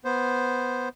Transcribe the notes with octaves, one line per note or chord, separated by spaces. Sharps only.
B3 C5